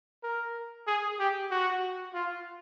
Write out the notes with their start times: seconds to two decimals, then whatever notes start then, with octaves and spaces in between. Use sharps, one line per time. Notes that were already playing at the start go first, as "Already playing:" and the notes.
0.23 A#4
0.87 G#4
1.19 G4
1.51 F#4
2.14 F4